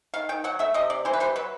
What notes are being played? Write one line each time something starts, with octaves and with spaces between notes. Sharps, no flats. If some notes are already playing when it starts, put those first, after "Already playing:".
D#3 F5
D#3 G5
F#3 F#5
A3 E5
C3 D#5
C3 D5
E3 C5
B4
G3 C5
F#3 B4